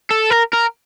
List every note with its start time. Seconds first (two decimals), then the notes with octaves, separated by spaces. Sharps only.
0.11 A4
0.30 A#4
0.53 A#4